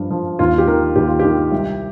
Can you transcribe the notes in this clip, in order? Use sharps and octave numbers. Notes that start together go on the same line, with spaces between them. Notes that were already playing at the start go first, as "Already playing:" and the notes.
Already playing: G2 F3
F3
D#2 F4
G4
D#3 A#4
D#2 G4
F4
D#3 G4
C2